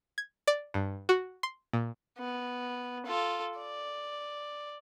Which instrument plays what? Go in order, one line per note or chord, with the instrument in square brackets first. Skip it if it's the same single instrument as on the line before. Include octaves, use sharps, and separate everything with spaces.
[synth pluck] G#6
D5
G2
F#4
C6
A#2
[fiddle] B3
F4 A4
D5